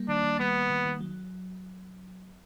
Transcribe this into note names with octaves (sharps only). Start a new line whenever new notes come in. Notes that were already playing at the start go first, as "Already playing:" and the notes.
Already playing: G3 A#3
D#3 D4
D#3
G3 B3
A#3
D#3
D#3
F#3